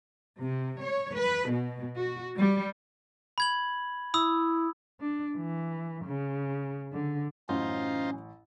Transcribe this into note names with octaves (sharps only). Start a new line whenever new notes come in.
C3
C#5
B4
B2
F#4
G3
B5 G#6 F#7
E4 B5 D#6 E6
D4
E3
C#3
D3
A1 F#2 C#4 D#4 F4 C5